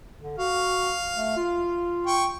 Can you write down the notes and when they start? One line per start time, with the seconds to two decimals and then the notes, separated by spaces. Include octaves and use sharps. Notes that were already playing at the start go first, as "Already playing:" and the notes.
0.22 D3
0.38 F#4 F5
1.16 A3
1.37 F4
2.06 G5 C#6